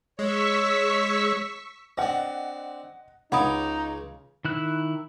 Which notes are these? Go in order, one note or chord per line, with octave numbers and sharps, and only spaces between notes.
G#3 C#5 C#6 E6 B6
C4 D4 D#5 F#5
C#2 C#3 D#4 C#5 F#5 B5 D6 D#6
D#3 E4 F#6